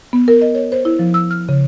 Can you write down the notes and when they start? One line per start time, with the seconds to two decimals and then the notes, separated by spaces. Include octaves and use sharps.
0.13 B3
0.28 A#4
0.42 D#5
0.55 C#5
0.72 C5
0.85 E4
0.99 F3
1.14 E6
1.31 F6
1.49 C#3